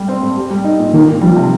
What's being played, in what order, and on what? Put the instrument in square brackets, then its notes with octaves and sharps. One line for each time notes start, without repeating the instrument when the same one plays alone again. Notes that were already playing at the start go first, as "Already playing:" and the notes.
Already playing: [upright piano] G3 G4
C4
G2
G4
G3
D#4
A#2
[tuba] D#3 [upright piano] A#3
[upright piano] D#3
[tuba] F3 [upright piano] G3
[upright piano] C3